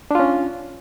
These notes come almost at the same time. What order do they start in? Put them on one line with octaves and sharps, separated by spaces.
D4 F4 C#4